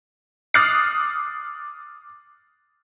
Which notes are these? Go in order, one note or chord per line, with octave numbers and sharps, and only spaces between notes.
D6 D#6 F6 F#6 A6 C7